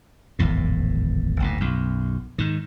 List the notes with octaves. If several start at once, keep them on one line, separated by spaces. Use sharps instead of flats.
D1 G#1 E2 A2
F#1 D2 G#2
B1 F#2
G#2 D#3